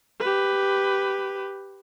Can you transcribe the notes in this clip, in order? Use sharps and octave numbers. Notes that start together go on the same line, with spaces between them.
G4 B4